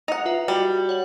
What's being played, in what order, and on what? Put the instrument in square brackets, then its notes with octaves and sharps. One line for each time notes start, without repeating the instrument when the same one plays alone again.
[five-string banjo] D#4 F#5 [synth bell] F7
[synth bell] F4 B4 E5
[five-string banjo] G3 [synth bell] F#4
[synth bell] C#5 F#5 F#7